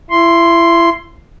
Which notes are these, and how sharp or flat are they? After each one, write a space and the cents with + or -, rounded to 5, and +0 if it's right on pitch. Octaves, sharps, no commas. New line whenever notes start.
E4 +30 C6 +0